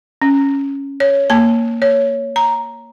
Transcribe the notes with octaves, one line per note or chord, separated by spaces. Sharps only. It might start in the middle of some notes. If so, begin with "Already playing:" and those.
C#4
C#5
A#3 A5
C#5
A#5